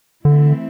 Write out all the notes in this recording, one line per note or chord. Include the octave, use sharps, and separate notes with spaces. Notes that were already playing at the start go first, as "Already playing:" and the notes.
D3 E3 A3 C4 E4